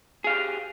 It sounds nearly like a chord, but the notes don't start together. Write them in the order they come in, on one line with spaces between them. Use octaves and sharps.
G#4 F5 G4